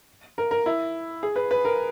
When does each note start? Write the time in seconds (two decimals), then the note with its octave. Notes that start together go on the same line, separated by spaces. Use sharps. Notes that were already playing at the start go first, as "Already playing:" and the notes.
0.38 A#4
0.51 A#4
0.66 E4
1.23 G#4
1.36 B4
1.51 B4
1.65 A#4